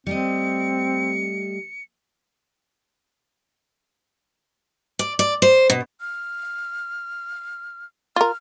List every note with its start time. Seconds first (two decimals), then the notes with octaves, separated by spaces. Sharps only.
0.07 G3 A3 C4 D#5 C#7
4.99 D5
5.19 D5
5.42 C5
5.70 B2
6.00 F6
8.16 F4 A#4 F6